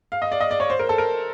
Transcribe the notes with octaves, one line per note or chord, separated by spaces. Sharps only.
F5
D#5
D5
D#5
D5
C#5
C5
A#4
A4
A#4